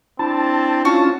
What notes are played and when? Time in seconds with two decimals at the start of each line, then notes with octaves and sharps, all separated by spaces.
0.19 C4 D4 E4 A5
0.85 C#4 F4 F#4 A5